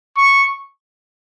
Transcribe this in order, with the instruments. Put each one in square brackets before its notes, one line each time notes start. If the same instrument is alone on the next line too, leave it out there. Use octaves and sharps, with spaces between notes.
[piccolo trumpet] C#6